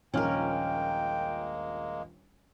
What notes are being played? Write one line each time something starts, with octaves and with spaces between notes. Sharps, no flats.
D#1 A#1 G#3 A#3 C#4 A#4 G5 F6